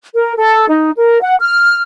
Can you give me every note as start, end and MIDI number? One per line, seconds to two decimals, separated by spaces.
0.14 0.32 70
0.37 0.68 69
0.69 0.90 63
0.97 1.21 70
1.21 1.36 78
1.40 1.81 89